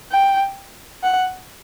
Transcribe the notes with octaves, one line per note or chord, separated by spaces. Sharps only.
G5
F#5